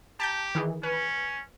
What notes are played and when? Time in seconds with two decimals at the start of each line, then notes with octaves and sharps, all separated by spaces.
0.20 G4 A5 A#5 G6
0.55 D#3 E3 G#4
0.83 C#4 B4